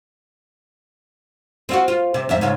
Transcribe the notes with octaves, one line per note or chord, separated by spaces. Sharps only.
C4 F4 F#4
F4
C3
F2 G#2 E5
G#2 C#3 F4